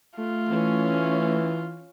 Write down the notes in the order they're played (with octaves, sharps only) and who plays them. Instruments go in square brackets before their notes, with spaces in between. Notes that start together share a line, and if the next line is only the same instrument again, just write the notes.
[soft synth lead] A3 [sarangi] F4
[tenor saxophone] E3 [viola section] C#4